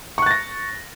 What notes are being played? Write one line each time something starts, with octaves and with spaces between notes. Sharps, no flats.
C#6 F#6 A6 A#6